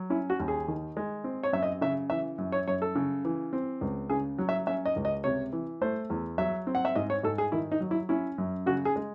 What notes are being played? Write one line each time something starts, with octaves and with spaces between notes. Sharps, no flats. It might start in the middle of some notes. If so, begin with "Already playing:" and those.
Already playing: F#3
C#4 E4
F#4
D#2
G#4
D#3
G#3
C4
C#5
F#2 E5
D#5
C#3 E5
E3 E5
F#2
C#5
F#2 C#5
A4
C#3
E3
C4
C#2
C#3 G#4
F#3
E5
C#4 E5
D#5
C#2
D#5
C3 C#5
E3
A3 C5
E2
F#3 E5
C4
F#5
E5
G#2 D#5
C#5
G#2 A4
G#4
D#3 E4
D#4
F#3
E4
C#4 E4
F#2
C#3 F#4
G#4
G#3